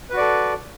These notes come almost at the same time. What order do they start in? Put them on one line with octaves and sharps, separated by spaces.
B4 F#4 D5 A4